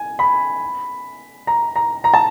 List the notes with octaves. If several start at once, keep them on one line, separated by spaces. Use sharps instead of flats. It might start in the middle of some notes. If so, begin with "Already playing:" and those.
Already playing: G#5
B5
A#5
A#5
A#5
A5